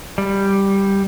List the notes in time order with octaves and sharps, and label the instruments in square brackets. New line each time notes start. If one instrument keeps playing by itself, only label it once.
[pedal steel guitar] G3